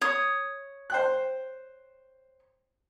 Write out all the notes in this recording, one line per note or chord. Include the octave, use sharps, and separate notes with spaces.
C#5 D#6
C5 G5 F#6